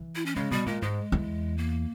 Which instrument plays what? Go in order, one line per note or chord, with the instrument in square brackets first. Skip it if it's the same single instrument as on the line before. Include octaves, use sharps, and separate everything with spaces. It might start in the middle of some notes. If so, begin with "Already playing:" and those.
Already playing: [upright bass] E3
[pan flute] E4
C#4
[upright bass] C#3 [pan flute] G#3
[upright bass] B2 [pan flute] G3
[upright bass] A#2 [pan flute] G#3
[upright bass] G#2 [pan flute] G#3
[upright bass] E2
[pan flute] A#3